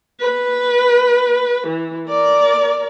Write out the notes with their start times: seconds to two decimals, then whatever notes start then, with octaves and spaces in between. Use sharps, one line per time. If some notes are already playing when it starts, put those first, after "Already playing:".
0.21 B4
1.67 E3
2.08 A#4 D5